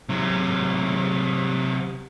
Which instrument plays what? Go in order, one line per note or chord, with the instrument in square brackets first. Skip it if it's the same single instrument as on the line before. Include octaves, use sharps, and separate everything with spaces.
[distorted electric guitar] C3 F#3